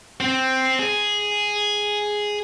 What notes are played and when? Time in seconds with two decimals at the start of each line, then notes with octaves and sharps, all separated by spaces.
0.20 C4
0.79 G#4